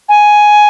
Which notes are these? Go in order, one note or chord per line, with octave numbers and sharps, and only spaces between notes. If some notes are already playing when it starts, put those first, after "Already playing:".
G#5